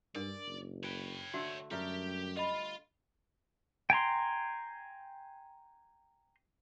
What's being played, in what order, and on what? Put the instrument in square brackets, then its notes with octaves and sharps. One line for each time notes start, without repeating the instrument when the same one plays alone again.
[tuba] G2 [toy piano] D4 A#4 [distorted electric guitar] D5
[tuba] F#1
[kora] B4 [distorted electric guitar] C#5 G5
[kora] D3 A3 [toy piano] F#4
[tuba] F#2 [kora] G3 A3 A#4 [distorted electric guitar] G4
[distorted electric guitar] F4 [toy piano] D#5 B5
[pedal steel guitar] G5 G#5 A#5 C6